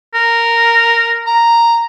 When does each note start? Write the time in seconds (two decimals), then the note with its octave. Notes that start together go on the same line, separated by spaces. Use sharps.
0.15 A#4
1.27 A#5